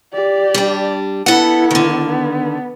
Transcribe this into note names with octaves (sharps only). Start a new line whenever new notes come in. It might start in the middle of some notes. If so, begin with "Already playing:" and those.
G4 D5
G3 D4
B3 E4 A4 F#5
D3 D#3
B3